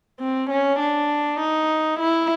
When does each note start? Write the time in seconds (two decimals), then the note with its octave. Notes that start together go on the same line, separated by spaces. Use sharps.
0.20 C4
0.50 C#4
0.79 D4
1.40 D#4
1.99 E4